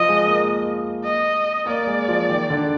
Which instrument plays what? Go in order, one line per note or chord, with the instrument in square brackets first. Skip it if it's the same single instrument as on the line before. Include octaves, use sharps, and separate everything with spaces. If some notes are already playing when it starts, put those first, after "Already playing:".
Already playing: [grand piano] F3 [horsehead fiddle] D#5
[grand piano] G#3
A#3
[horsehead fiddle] D#5
[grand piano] A#3 [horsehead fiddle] D5
[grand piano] G#3
F3
D#3
D3